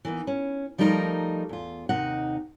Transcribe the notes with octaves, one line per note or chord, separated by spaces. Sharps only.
E3 A#3 B3 D#4
C#4
F3 G3 A3 D#4 E4 A#4
E2 F4
D#2 C3 D#4 F#5